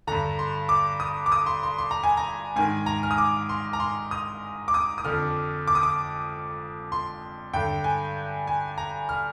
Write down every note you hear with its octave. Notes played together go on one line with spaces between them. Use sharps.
G2 D3 A#5
C6
D6
D#6
D6
D#6
C6
C6
C6
A#5
G#5
A#5
G#2 D#3 G#5
A#5
F6
D#6
D6
C6
A#5
C6
D#6
D6
D#6
D#6
F2 D3 F6
D6
D#6
D6
C6
G2 D3 G5
G#5
G#5
A#5
F6